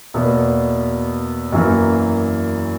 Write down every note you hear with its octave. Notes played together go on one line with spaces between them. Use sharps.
E2 B2 A#3
F#2 E3 A#3